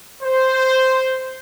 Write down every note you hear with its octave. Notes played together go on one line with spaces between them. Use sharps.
C5